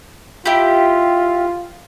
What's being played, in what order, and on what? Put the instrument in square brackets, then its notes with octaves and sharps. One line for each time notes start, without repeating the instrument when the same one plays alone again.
[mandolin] E4 G4 [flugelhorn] F4